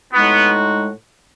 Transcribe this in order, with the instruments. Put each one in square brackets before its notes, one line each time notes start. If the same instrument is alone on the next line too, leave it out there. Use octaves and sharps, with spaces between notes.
[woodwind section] A2 G#3 D#4 F#4 [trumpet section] B3